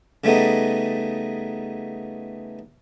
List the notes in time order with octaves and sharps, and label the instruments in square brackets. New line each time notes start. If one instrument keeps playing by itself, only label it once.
[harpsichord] C#3 G3 A3 B3 D#4